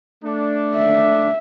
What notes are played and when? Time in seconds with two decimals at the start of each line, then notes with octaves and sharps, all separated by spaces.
0.24 A3 D4
0.75 E5